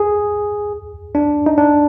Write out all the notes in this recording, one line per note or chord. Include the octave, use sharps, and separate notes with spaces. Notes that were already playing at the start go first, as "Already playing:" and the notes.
Already playing: G#4
D4
D#4
D4